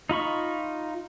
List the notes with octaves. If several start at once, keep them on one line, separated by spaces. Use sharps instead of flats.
D#4 F4 B5 C#6